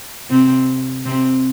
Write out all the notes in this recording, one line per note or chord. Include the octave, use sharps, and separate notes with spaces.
C3 C4
C3 C4